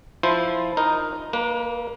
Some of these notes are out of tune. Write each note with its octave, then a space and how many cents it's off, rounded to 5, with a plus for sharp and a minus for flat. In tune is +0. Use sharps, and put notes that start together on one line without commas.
F3 +0 E4 +0 C5 +0
D#4 +0 A#4 +5
A#3 +0 B4 -40